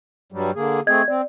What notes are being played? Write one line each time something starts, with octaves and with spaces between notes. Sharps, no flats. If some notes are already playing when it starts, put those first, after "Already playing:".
G2 F#3 G3
D3 A#3 G#4
A3 C4 G#4 D#5 G#6
C4 D5